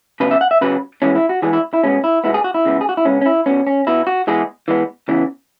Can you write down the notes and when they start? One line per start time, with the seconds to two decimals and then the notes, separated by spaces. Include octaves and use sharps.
0.20 C#3 F#3 B3 B4
0.31 E5
0.41 F#5
0.51 E5
0.61 C#3 F#3 B3 B4
1.02 E3 G#3 B3 C#4
1.15 E4
1.29 F#4
1.42 E3 G#3 B3 G#4
1.53 E4
1.74 E4
1.83 B2 G#3 B3 C#4
2.04 E4
2.24 B2 G#3 B3 E4
2.34 G#4
2.44 F#4
2.54 E4
2.65 C#3 G#3 B3
2.81 G#4
2.89 F#4
2.97 E4
3.05 C#3 G#3 B3 C#4
3.21 C#4
3.26 E4
3.46 B2 B3 C#4
3.67 C#4
3.87 B2 B3 E4
4.07 F#4
4.27 E3 G#3 B3 G#4
4.68 E3 G#3 B3
5.09 C#3 E3 B3